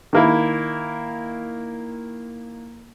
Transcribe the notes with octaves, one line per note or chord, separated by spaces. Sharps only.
D#3 A#3 E4